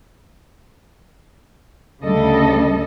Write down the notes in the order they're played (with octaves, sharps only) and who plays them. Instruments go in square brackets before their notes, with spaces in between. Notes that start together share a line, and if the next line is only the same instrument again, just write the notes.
[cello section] D2 C#3 G3 A4 D#5